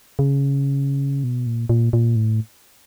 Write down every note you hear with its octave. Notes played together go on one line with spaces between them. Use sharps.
C#3
B2
A#2
A#2
A#2
A2